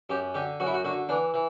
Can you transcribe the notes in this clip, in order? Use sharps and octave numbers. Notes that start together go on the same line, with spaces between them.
F#2 G4
D3 G4
F#2 F#4
E4
F#4
D3 F#4
E3 D4
E3